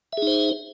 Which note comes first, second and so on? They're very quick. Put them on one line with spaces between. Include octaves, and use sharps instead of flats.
E5 G#4 D#4 C5